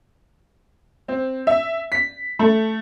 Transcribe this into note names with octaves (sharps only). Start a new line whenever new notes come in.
C4
E5
B6
A3